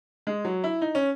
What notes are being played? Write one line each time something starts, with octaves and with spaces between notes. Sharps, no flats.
G#3
F#3
E4
D#4
C#4